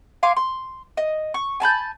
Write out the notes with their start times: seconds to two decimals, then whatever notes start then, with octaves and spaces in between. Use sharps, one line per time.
0.23 F5 G#5 C6 D6
0.37 C6
0.97 D#5
1.34 C#6
1.60 G#5 A5 B5 G6